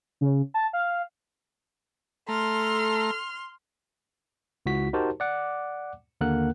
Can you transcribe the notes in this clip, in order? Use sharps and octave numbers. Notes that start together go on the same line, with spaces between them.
C#3
A5
F5
A3 A4 A#5 C6 F6
C#2 E4 F#4 B6
D#4 F#4 G4 A#4 C5 A5
D5 F#5 D6
D#2 D3 A#3 A#4 F#5 F#6